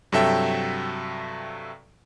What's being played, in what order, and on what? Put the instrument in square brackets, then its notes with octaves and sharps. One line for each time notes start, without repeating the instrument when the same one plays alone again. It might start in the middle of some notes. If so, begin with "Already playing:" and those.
[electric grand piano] G2 C3 F#3 A4 E5 G5